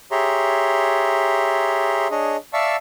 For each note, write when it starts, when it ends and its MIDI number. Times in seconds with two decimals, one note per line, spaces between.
0.11 2.07 67
0.11 2.07 68
0.11 2.07 73
0.11 2.07 76
0.11 2.07 82
0.11 2.07 84
2.11 2.37 62
2.11 2.37 68
2.11 2.37 73
2.11 2.37 75
2.53 2.76 74
2.53 2.76 76
2.53 2.76 77
2.53 2.76 81
2.53 2.76 85
2.53 2.76 88